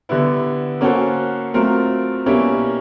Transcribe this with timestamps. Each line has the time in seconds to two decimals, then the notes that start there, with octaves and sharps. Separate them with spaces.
0.09 D3 G3 B3 E4
0.81 A#3 C#4 F#4 A4 C5
1.54 F#3 A3 C4 F4 A#4
2.26 B2 G3 A#3 C#4 E4